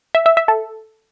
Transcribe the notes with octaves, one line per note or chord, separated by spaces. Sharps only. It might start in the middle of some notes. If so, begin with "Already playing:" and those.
E5
E5
E5
A4